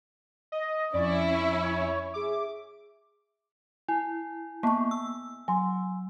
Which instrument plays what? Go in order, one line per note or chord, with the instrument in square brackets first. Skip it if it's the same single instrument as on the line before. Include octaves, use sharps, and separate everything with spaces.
[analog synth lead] D#5
[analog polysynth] F2 C#6 E6 [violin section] C#4 E4 [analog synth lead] D5
[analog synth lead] E5
C#5
[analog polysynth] G#4 E5 [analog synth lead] D6
[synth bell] E4 [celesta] G#5
[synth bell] A#3 B3 [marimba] A5 C#6
[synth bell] E6
[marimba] F#3 [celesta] G#5 C6